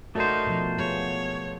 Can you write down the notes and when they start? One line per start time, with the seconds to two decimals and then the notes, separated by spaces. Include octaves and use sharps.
0.15 A3 D#4 F#4 A#4 C5 D5
0.47 B2 F3
0.78 B3 F4 G#4 C#5